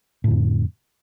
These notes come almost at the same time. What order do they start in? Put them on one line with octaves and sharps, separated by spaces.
A2 D3 F2